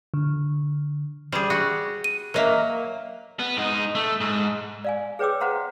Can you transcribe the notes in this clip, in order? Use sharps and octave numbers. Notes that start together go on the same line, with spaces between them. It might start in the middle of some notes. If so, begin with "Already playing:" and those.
D3
G3 G#4
F#4
D#7
F#3 A#3 A#4 D#5 E5
B3
G#2 D#4
A3
G#2
D5 F5 G#5
G#4 B4 C#5 G5 D6 E6
B4 C5 F5 F#5 A#5 C6